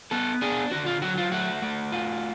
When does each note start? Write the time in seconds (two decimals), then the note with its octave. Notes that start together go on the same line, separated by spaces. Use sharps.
0.11 B3 A4
0.41 D4 G#4
0.71 D3 F#4
0.86 F4
1.02 F#3 F#4
1.18 F4
1.32 A3 F#4
1.62 A3
1.92 F4